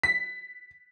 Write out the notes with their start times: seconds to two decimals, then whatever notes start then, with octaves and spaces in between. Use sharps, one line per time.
0.03 B6